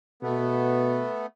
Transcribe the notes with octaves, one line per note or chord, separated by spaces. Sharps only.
B2 A3 B3